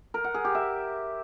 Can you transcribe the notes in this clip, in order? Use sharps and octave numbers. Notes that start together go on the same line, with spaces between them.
A#4
F#5
G#4
G4
E5